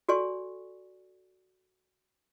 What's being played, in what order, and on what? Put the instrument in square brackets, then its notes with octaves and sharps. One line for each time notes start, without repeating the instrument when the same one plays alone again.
[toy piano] F#4 A4 D5 G#5 C#6